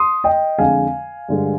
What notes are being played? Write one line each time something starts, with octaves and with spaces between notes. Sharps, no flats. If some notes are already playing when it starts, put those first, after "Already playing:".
Already playing: C6 D#6
D#5 G5
F2 D3 G#3 F5 G#5
G2 D3 G#3